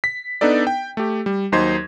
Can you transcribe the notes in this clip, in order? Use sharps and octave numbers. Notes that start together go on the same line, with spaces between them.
B6
B3 D4 D#4 A4 D5
G5
A3 G4
G3
D#2 F#3 D#4 C5 C6 G#6